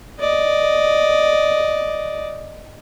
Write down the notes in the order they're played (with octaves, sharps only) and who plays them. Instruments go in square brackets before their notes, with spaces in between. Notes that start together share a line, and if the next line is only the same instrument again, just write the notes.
[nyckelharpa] D5 D#5